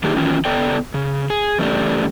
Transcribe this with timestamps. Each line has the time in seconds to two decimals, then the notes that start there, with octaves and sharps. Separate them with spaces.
0.04 D#3 A#3 D4 D#4 G4 G#4
0.16 D#3 E3 F#3 C#4 F4
0.45 C#3 B3 A4 D5 G5
0.94 C#3
1.30 G#4
1.59 E2 G2 C#3 A3 G4 D5